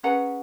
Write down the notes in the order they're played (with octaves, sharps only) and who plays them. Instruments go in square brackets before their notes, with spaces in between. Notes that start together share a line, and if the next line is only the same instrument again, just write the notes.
[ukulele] C#4 G#4 B4 F#5 A#5